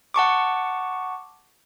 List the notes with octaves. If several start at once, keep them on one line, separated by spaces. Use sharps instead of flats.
F#5 A5 C#6 D6